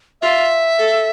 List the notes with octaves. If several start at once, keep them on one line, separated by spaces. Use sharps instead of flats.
F4 E5
A4